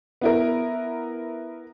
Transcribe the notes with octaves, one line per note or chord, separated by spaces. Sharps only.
B3 E4 A#4